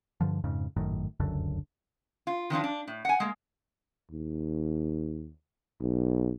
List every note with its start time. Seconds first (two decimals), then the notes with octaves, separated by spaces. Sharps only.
0.21 G2 D3 F3
0.44 F2 G#2 C#3
0.77 G#1 F#2 A2 D#3
1.20 F1 C#2 F#2 D3
2.27 F4
2.50 D#3 F3 D4 F4
2.64 D4
2.87 A2
3.05 F#5 G#5
3.20 G#3 A#3
4.11 D#2
5.81 B1